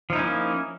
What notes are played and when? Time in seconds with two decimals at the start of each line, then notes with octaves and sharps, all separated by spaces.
0.10 F3
0.13 D#4
0.16 E4
0.19 C#4
0.22 A#3